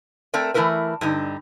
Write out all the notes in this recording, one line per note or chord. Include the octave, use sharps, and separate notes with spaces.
A3 C4 A4 A#4 D5
E3 A3 A#3 E4 A#4 B4
G2 D3 D#4